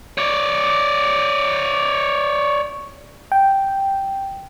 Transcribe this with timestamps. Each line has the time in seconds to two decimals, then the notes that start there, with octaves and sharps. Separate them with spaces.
0.18 C#5 D5
3.32 G5